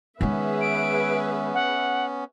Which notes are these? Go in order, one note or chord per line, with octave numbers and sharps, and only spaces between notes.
D#3 G#3 B3 C#4 G#4 B4 E5
D7
F#5